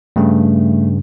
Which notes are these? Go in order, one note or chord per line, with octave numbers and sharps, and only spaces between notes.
G2 C#3 A3